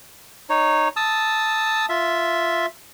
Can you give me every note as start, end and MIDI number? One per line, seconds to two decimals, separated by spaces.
0.50 0.88 63
0.50 0.88 73
0.96 1.86 81
0.96 1.86 87
0.96 1.86 88
1.89 2.66 65
1.89 2.66 76